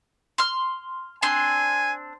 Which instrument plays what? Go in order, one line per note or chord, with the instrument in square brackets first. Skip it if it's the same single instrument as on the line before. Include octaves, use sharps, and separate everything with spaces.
[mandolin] C6 F6
[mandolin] C4 D4 C6 [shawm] G#5